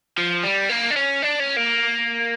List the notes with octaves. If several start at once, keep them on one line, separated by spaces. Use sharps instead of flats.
F3
G3
A#3
D4
C#4
D4
C#4
A#3